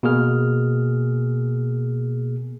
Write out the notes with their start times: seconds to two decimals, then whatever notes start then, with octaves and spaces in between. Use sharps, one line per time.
0.03 B2 A#3 G#4 F6